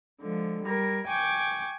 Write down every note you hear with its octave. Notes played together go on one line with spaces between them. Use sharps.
D3 F3 G#3
G3 A#4 G#6
G5 G#5 C#6 D6 G6